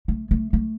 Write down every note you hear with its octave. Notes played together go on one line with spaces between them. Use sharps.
A3
A3
A3